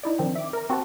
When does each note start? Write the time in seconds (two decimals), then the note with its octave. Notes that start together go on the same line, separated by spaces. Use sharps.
0.03 D#4 E4 D5
0.18 D#3 F3 C4 D4
0.35 E5 D6
0.53 A#4 A#5
0.70 C4 F#4 G4 F#5 A5